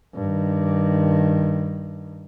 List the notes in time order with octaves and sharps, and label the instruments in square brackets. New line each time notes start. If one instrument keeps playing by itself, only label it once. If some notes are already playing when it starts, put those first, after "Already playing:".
[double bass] G2 D#3